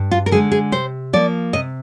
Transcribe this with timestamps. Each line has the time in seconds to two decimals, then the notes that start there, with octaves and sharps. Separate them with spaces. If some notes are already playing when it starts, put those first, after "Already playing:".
Already playing: G2
0.11 F4
0.26 A#4
0.31 D3 G#3 G#4
0.52 G#4
0.72 C3 C5
1.13 F3 A#3 D5
1.53 C3 D#5